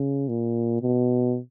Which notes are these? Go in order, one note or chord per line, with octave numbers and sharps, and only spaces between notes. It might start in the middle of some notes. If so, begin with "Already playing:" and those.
Already playing: C#3
A#2
B2